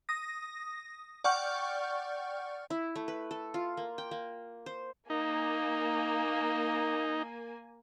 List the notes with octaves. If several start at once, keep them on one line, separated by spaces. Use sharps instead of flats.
D#6 A#6
D5 F#5 G5 C#6 F6 G6
E4
A3
B4
A4
F4
A#3
G5
A#3
C5
A#3 D#4 G#5